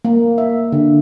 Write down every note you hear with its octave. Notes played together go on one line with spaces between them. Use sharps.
A#3
E5
D3